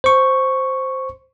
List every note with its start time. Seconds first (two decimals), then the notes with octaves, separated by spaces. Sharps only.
0.04 C5 C#6